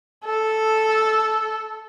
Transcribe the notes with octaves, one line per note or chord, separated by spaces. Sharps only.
A4